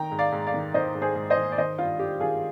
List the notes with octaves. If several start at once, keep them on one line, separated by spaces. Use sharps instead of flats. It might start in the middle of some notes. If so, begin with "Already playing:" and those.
Already playing: D#3 G5 A#5
G#2
D5 F5
G#2
D5 F5
D#3
D#3 C5 D#5
G#2
G#4 C5
G#2
C5 D#5
D#3
D5
D#3 C5 D#5
G2 F4
G2 G4
D#3 F4 G#4